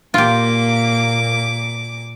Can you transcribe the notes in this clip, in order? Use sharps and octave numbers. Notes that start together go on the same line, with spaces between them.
A#2 A#3 F4 G4 D6